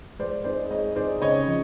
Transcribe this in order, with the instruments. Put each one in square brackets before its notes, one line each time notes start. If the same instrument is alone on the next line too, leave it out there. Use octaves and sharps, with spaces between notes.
[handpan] G#3 [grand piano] C5 D5
[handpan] C4 D#4 G#4 [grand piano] C5 D5
[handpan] G#3 [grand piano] C#5 D#5
[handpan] C4 D#4 G#4 [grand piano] C5 D5
[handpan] C#3 [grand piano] C#5 D#5
[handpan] F3